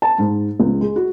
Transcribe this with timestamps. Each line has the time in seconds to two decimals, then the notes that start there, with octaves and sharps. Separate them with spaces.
0.02 A5
0.18 G#2
0.60 C#2
0.81 G#3
0.96 F#4